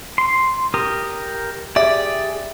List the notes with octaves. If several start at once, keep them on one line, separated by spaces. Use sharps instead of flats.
C6
G4 A#4 D#6
G4 G#4 D5 E5